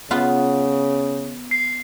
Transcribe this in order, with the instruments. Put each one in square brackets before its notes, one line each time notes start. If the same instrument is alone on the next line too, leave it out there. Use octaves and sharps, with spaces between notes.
[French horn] C#3 [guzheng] B3 F4
[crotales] C7